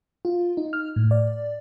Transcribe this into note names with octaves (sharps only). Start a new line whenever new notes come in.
F4
D#4
F6
A2
D5